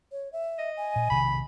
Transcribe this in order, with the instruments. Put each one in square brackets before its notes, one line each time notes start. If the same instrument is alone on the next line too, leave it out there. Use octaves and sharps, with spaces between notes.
[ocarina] C#5
E5
[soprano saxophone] D#5
[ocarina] G#5
[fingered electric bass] A#2
[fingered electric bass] B1 C3 D#3 [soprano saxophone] B5